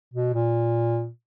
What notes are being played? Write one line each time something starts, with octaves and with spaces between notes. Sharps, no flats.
B2
A#2